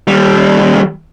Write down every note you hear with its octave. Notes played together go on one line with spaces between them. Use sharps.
D#2 G3